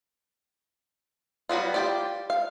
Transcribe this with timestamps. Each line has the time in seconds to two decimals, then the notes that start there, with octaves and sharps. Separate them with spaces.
1.49 F#3 G3 B3 F4
1.74 F4 G4 D5
2.30 F5